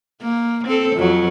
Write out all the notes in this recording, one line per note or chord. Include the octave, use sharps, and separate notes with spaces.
A#3
C4 A4
F2 F#3